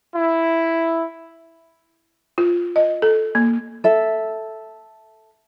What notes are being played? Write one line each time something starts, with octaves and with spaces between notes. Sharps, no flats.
E4
F4
D#5
A4
A#3
A4 E5